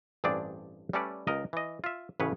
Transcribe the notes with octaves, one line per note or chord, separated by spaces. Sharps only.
A1 G2 C4 D4 G#4 D5
G3 A3 C#4 A4 B4 D5
C#2 A#4 D#5
E3 D#5
F4 E5
A1 A2 C#3 B4 C#5